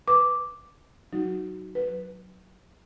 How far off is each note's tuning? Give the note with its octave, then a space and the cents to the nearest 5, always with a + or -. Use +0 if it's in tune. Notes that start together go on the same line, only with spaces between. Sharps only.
B4 +0 D6 +0
F#3 +10 D#4 +0 F#4 +5
F#3 +0 B4 +0